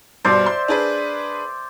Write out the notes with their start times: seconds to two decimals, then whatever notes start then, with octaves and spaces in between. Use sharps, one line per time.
0.25 G2 B2 C5 D5 E5
0.46 C6
0.68 D4 G#4 B4